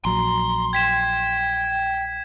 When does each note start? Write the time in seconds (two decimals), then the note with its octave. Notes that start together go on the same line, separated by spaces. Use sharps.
0.05 A#1 F#3 A#5 C6
0.73 G5 G#6 B6 E7